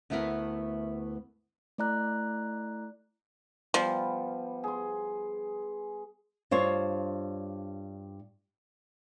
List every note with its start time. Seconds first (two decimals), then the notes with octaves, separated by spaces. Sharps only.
0.10 D2 A3 B3 E4 A#4 B4
1.78 A3 E4 D5 A#5 F#6
3.74 F3 G3 B3
4.64 G#4 C6
6.51 G2 F4 C5 C#5